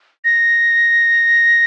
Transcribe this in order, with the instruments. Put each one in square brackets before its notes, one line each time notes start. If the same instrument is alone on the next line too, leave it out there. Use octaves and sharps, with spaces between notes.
[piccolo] A#6